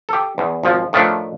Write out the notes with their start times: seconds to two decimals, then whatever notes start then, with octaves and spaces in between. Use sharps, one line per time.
0.09 G4 A4
0.38 E2
0.63 G#1 F3
0.93 A2 D#3 F3 A3 D4